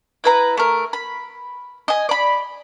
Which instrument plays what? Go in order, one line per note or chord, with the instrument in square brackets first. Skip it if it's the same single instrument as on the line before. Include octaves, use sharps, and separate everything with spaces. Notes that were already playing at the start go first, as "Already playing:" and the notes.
[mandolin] E4 B4 A#5
A3 A#4
B5
D#5 G#5
D5 B5